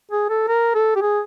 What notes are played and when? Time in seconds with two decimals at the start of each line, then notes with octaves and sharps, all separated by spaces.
0.11 G#4
0.29 A4
0.48 A#4
0.75 A4
0.96 G4
1.02 G#4